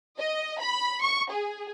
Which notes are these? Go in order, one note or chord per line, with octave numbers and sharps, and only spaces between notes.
D#5
B5
C#6
G#4